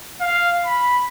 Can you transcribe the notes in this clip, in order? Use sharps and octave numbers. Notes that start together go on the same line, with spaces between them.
F5
B5